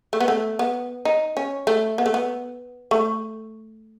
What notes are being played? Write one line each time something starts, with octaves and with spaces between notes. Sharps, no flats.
A3
B3
A3
B3
D#4
C#4
A3
B3
A3
B3
A3